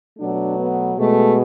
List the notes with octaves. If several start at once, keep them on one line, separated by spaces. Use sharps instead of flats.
B2 F#3 A3 D4
B3
B2 G#3 A3